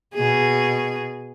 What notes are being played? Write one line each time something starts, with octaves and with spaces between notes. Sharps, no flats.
B2 G#4